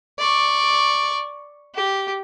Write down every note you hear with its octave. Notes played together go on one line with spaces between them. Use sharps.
D5 C#6
G4